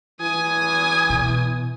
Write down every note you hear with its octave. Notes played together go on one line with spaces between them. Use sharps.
E3 G#5 D#6
B2